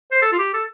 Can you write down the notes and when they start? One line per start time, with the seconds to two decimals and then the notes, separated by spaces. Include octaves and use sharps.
0.11 C5
0.22 A4
0.32 F4
0.38 G4
0.54 A4